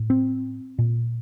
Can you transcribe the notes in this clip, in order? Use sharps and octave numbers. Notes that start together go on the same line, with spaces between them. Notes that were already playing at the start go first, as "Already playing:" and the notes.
Already playing: A2
C4
A#2